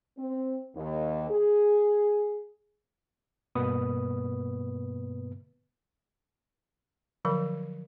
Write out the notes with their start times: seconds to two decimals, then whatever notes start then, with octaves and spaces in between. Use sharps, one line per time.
0.17 C4
0.75 D#2
1.29 G#4
3.55 G2 B2 A#3 B3 B4 D#6
7.25 D3 F3 F#3 A#4 F5